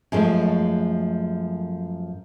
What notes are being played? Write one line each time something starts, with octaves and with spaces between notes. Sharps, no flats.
F#2 F3 G#3 A3